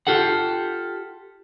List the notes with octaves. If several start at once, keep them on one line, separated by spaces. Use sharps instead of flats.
F4 G4 A4 F#5